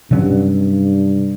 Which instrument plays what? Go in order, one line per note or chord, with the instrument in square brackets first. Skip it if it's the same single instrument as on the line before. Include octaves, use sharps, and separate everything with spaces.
[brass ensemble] G2 [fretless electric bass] C3 F#3 C#4